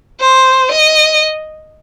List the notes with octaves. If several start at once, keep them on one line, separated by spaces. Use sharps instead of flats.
C5
D#5